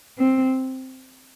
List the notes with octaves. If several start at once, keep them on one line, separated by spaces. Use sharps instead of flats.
C4